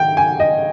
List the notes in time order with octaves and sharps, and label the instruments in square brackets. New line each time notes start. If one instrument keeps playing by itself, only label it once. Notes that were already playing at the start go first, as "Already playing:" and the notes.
Already playing: [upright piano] D#3 G5
G#5
D#5